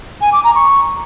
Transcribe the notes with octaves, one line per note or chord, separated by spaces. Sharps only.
G#5
D6
A#5
C#6